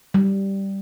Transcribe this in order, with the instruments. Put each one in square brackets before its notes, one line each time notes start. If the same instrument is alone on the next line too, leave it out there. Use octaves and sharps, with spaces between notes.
[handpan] G3